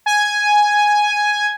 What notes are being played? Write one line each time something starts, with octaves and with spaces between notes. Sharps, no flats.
G#5